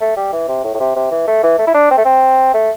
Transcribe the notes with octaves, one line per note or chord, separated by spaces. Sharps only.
A3
G3
E3
C3
A2
A2
C3
C3
E3
A3
E3
A3
E4
D4
C4
A3
C4
A3